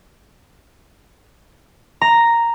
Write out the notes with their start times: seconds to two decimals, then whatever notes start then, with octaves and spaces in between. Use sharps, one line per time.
2.01 A#5